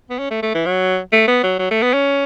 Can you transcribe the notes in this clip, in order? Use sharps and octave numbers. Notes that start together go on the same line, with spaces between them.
B3
C#4
A3
A3
E3
F#3
A3
B3
F#3
F#3
A3
B3
C#4